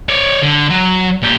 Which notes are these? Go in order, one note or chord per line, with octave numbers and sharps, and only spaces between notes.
C#5 D5
D3
F#3
A#2 G4